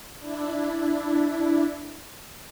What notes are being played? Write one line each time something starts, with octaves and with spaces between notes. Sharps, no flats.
D4 E4